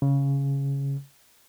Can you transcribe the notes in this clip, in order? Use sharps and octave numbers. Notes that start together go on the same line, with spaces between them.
C#3